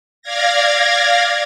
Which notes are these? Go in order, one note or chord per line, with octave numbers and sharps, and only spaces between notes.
D5 F5 G#6 A#6